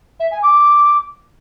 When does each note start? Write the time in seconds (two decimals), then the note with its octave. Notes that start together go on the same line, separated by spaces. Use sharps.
0.20 E5
0.31 G#5
0.43 D6